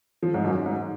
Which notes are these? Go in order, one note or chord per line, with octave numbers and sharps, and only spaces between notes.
F3
G#2
F#2
G#2